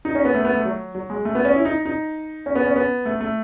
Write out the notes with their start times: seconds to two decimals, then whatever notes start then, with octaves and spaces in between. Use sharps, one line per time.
0.05 D#4
0.15 C#4
0.25 B3
0.34 A3
0.45 B3
0.55 A3
0.65 F#3
0.95 F#3
1.10 G#3
1.25 A3
1.35 B3
1.45 C#4
1.55 E4
1.65 D#4
1.85 D#4
2.46 C#4
2.55 B3
2.66 C#4
2.76 B3
3.05 A3
3.21 A3